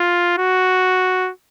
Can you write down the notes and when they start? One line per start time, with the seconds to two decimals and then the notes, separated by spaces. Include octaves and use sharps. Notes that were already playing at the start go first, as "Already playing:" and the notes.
Already playing: F4
0.38 F#4